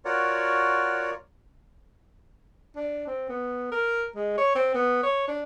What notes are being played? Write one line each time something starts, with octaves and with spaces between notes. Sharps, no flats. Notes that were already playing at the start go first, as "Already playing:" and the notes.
F4 F#4 A#4 C#5 D5 F#5
D4
C4
B3
A#4
G#3
C#5
C4
B3
C#5
D4